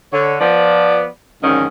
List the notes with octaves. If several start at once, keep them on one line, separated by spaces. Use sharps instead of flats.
D3 C#5
F3 B3 D5
F2 G#2 D3 D#3 C#4 D#4